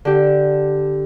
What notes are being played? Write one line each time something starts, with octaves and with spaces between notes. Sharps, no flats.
D3 G4